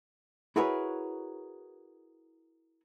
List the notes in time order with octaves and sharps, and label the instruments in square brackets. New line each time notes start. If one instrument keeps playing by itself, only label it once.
[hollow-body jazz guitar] E4 F#4 G#4 A#4 B4 C#5